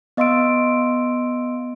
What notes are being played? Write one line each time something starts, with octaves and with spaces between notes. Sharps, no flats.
B3 D#5 F5 C6 E6 D7